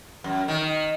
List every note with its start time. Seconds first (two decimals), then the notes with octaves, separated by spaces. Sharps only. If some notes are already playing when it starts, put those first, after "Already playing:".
0.24 F#2
0.48 D#3